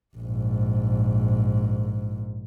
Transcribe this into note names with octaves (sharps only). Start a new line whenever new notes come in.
A#1 G#2